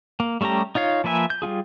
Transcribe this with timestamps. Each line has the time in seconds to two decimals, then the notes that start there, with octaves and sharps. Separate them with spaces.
0.20 A#3
0.41 G3 A3 C#4 G4 A#5
0.75 D#4 F4 C#5 F5
1.04 F3 A#3 B4 E5 G#5
1.30 G6
1.42 G3 C#4 F4 G#4